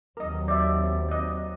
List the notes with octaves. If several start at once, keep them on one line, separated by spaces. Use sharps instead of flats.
D#2 F#3 C4 A#4 D#5
D5 E5
D5 D#5